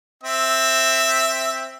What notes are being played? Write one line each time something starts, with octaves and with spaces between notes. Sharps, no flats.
C4 E5